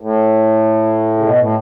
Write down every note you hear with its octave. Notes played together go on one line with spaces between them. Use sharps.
A2
C#3
B2
A2